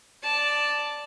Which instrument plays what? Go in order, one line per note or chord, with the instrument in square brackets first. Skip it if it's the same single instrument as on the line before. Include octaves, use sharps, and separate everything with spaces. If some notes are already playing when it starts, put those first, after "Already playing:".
[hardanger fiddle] D5 A5